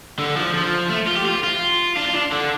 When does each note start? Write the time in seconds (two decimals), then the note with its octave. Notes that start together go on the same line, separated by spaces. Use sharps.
0.18 D3
0.37 F3
0.54 F3
0.90 A3
1.08 F4
1.16 G4
1.26 F4
1.44 F4
1.97 D4
2.05 F4
2.15 D4
2.32 D3